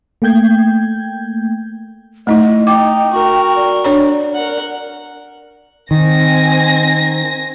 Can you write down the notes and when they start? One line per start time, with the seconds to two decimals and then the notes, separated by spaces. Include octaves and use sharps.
0.22 A3 A#3 G5 G6 G#6
2.27 A3 D#4 E4 D#5
2.67 D#4 G5 D6
3.12 F#4 A#4
3.56 D5
3.84 D4 C#5 A#5
4.35 A#4 F#5
5.91 D#3 C4 G#5 A#6